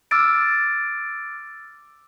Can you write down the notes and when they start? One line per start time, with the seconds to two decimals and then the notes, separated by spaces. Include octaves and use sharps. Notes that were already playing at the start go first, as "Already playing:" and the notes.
0.11 D6 E6 F6 A6 D7